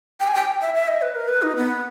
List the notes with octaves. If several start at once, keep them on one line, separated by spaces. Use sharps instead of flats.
G5
G#5
G5
E5
E5
D#5
B4
A#4
B4
D#4
B3